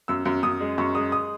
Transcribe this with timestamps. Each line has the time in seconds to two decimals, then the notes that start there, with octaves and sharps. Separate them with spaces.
0.08 F#2 E6
0.25 F#2
0.43 F#2 D#6
0.60 G#3
0.78 F#2 C#6
0.95 G#3 D#6
1.12 D#6